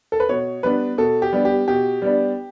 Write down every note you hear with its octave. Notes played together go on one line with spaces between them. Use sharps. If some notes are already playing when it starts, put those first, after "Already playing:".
A4
B4
B2 C#5
G3 B3 D4 B4
B2 A4
G4
G3 B3 D4
G4
B2 G4
G3 B3 D4